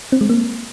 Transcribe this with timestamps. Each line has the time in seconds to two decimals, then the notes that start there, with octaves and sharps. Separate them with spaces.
0.12 C4
0.21 G#3
0.29 A#3